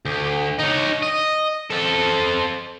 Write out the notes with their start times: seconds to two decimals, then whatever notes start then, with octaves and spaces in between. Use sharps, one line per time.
0.05 D2
0.59 D#4 C#5
1.03 D#5
1.70 C4 A4